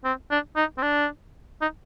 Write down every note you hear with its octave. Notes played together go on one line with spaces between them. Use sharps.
C4
D4
D#4
C4
D4
D#4